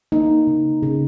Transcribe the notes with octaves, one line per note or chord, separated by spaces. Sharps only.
A#3 D#4
C#3
C#3